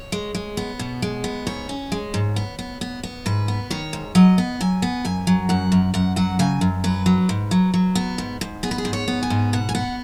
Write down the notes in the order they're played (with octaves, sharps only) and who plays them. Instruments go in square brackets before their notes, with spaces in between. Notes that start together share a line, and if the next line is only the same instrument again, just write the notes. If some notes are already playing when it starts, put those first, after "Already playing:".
Already playing: [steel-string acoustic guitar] C#5
G#3
G#3
B3
B2
G#3
B3
G#2 C#5
C#4
G#3
G#2
B3
B3
B3
B3
G#2 B4
B3
D#3 C#5
G#2
F#3 D#5
B3
F#3 G#5
B3
F#2 G#5
F#3
F#2 F#5
F#2
F#2 F#5
F#3 F#5
C#3 G#5
F#2
F#3 B4
F#3
G#2
F#3
F#3
B3
G#2
G#2
B3 G#4
B4
G#4
G#2
C#5
B3
G#5
G#2
B2 F#5
G#5
B3 F#5